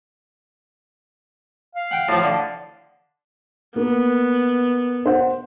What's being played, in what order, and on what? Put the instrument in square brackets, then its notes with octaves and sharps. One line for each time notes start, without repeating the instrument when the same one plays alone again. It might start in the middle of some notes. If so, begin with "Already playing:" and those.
[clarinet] F5
[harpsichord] F#5 G5
A2 F3
D3
[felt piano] A#3 [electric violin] B3
[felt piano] C5 F#5